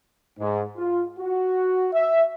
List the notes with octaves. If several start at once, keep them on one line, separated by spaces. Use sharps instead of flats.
G#2
F4
F#4
E5